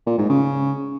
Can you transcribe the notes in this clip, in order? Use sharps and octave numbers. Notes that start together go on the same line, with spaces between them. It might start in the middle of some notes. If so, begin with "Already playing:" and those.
A#2
G#2
C#3